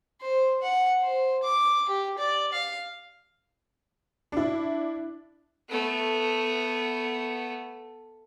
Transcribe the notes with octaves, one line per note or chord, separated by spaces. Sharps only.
C5
F#5
C5
D6
G4
D5
F5
D4 E4
A3 B3